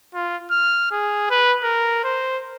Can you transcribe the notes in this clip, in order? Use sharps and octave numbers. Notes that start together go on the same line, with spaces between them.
F4
F6
G#4
B4
A#4
C5